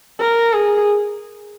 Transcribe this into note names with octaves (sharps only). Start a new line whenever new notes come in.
A#4
G#4